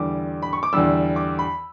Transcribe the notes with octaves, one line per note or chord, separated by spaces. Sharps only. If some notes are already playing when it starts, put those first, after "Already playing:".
Already playing: E2 D3 G3 D6
B5
C#6
D6
E2 D3 G3 E6
D6
B5